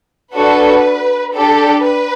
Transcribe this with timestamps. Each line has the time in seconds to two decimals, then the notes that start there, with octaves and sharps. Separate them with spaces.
0.34 D4 F#4 A4 B4
1.33 D4 G4 A4
1.83 B4